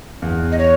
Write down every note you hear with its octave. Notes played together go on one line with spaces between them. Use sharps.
E2
D#5
C#5